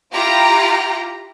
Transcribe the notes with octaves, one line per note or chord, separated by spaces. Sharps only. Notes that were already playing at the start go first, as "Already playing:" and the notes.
E4 F4 G4 A#5